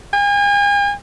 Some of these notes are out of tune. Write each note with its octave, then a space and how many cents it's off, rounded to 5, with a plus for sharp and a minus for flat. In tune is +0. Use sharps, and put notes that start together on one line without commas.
G#5 -40